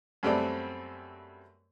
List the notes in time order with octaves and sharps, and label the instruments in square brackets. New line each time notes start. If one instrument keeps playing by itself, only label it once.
[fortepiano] F#2 G3 A3 B3 C4 D5